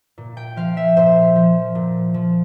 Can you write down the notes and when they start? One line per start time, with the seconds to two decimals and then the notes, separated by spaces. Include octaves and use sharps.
0.18 A#2
0.37 G5
0.56 F3 F5
0.77 E5
0.97 A#2 C5
1.35 F3
1.75 A#2
2.14 F3